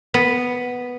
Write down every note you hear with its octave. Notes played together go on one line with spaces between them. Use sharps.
B3